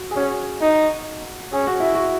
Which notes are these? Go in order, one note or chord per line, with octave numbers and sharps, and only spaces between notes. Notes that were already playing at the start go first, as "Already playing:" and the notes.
Already playing: F#4
G#4
C#4 F#4
D#4
C#4 G#4
F#4
E4
F#4